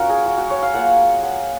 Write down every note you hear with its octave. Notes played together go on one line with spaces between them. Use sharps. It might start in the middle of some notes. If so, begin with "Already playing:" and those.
Already playing: C#4 F4 F#4 A#4
G#4
F#4
F#4
C#5
F5
F#3 A#3 F4 F#5
F#5